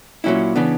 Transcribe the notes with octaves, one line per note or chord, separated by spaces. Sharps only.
A#2 F#3 C#4 E4
C#3 E3 B3 D4